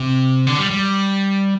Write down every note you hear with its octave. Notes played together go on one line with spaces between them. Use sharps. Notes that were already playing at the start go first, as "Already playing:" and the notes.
Already playing: C3
D3
G3
G3